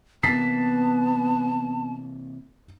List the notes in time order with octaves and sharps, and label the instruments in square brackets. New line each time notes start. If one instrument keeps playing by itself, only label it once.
[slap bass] C3 E3 A#3 [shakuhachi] B3 [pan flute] A5 [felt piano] A6 B6 C7